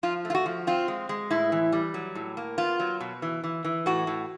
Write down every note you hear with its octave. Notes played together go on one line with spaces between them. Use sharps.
F3 F4
A3
F4
F#4
F3
C4 F4
G#3
G#3
A2 E4
E3
G3
F#3
A2
A#3
B3 F4
F#3
B2
E3
E3
E3
A2 F#4
A2